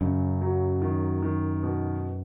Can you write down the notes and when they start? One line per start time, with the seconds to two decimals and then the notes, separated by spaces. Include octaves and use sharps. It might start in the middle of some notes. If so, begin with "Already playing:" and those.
0.01 F#2 C#3
0.41 F#3
0.82 D#3
1.23 D#3
1.63 B2